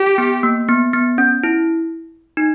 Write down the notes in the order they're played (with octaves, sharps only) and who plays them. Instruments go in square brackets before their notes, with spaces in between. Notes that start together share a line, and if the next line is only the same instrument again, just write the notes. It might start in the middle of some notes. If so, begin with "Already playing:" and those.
Already playing: [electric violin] G4
[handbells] B3
A#3
B3
B3
C#4
E4
D#4